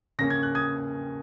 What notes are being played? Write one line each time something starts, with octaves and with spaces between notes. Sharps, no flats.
C#3 A#3 C#4 A#6
G#6
F#6
D#6 G#6